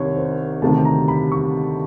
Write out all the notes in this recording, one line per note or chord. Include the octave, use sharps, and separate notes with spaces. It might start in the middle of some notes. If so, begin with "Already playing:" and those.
Already playing: C2 C3 D#3 C#5
C5
D2 C3 D#3 A5
A#5
B5
C#6